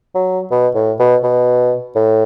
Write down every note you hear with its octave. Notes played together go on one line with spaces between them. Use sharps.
F#3
B2
A2
B2
B2
A2